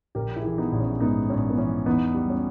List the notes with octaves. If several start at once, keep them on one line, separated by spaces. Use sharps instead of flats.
A#1 G4 A#4
E4 G#4
E3
B3 D#4
A#1
C#4
G#2 B3 D#4
A#1 C#4
B3
E3 C#4
E2 B3 D#4
G3
C#4